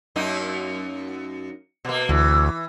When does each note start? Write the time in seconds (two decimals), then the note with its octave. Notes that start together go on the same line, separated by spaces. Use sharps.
0.16 F#2 A#3 D#4
1.85 B2 A#3
2.09 D2 E3